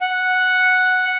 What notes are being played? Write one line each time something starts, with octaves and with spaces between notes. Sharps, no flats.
F#5